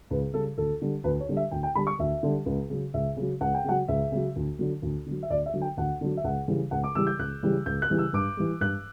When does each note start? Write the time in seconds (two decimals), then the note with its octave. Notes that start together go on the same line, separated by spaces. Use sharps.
0.10 C#2 B4
0.34 C#3 G3 A4
0.57 D2 A4
0.82 D3 G3
1.04 D2 B4
1.20 C#5
1.29 D3 G3
1.37 E5
1.51 D2 G5
1.63 G5
1.75 D3 G3 B5
1.87 C#6
1.99 D2 E5
2.23 D3 G3
2.46 C#2
2.70 C#3 F#3
2.94 C#2 E5
3.17 C#3 F#3
3.41 C#2 F#5
3.54 G5
3.65 C#3 F#3 F#5
3.88 C#2 E5
4.12 C#3 F#3
4.36 D2
4.59 D3 F#3
4.82 D2
5.06 D3 F#3
5.23 E5
5.30 D2 D5
5.46 E5
5.54 D3 F#3
5.62 G5
5.77 D2 F#5
6.01 D3 F#3
6.17 E5
6.24 C#2 F#5
6.48 C#3 E3 G3
6.71 C#2 F#5
6.84 D6
6.95 C#3 E3 G3 E6
7.07 G6
7.19 C#2 F#6
7.43 C#3 E3 G3
7.66 C#2 G6
7.82 F#6
7.90 C#3 E3 G3
7.98 E6
8.13 G2 D6
8.37 E3 G3
8.60 G2 F#6